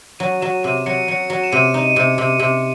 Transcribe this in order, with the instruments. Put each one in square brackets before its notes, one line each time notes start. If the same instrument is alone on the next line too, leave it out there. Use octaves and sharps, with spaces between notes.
[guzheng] F#3 [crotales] D#7
[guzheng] F#3 [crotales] E7
[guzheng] C3 [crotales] D#7
[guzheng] F#3 [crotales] C#7
[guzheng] F#3 [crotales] C#7
[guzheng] F#3
[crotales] E7
[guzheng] C3 [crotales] D#7
[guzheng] D#4
[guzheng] C3 [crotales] C#7
[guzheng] C3
C3